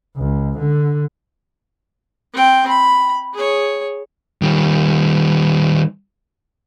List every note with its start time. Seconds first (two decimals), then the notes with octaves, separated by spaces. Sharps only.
0.17 C#2
0.59 D3
2.33 C4 G5
2.68 B5
3.33 G#4 C#5
4.42 D#3 G3